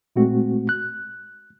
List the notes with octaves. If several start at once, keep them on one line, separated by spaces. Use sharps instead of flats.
A#2 G#3 A3 C4 F#4
F#6